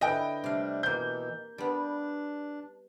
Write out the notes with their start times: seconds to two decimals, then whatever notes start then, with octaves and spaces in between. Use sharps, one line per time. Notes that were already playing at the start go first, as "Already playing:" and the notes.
0.01 D3 E4 B4 D#5 G5
0.44 C3 G3 A3 D4 F5
0.83 B2 E3 A#3 C6 G6
1.58 G3 B3 D4